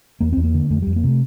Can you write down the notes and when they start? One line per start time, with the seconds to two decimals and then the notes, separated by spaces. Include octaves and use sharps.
0.21 E2 A#3
0.32 E2 C4
0.44 A#3
0.54 D3
0.70 F2 A3
0.82 F2 G3
0.96 A#3
1.04 C3 A3